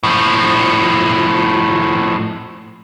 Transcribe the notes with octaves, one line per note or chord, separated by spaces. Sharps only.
A2 F3